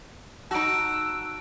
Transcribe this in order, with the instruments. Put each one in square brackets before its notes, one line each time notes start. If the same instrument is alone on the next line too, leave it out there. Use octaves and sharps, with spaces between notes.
[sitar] D#4 F#4 [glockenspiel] A5 D7 [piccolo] E6